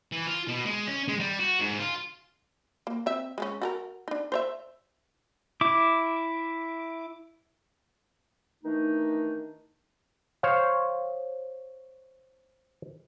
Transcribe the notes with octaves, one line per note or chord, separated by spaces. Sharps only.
E3
F4
B2
G#3
C#4
G#3
G3
F#4
G#2
F4
A#3
C4 E5
G#3 A3 C#4
F#4 A4 A#4
D4 D#4
C5 C#5 E5
E4 D6
D#3 E3 A3 D4 D#4
C5 C#5 F5